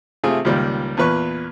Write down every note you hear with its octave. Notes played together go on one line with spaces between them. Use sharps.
C3 A3 F4 G#4
C#2 A#2 D#3 G3 A#3
E2 A#2 B4 C#6